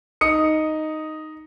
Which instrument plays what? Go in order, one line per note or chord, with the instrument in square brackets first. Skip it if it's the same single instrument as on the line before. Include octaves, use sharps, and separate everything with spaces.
[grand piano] D#4 D#6 C#7